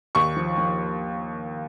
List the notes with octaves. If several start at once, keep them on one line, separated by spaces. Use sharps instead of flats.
D#2 C#6
F3
F3